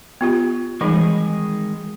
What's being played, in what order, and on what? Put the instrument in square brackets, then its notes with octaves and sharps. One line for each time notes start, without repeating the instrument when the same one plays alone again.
[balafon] B3 F4 G4
[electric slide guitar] D#3 G#3 [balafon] E3 G3 D#4